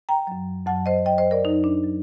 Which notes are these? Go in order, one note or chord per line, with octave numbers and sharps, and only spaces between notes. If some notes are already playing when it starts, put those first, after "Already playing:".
G5 A#5
F#2 F#3
F#2 F#3 F#5 A5
C5 D#5
F#2 F#3 D#5 G5
C5 D#5
A#4 D5
F#2 F#3 D#4
D4
F#3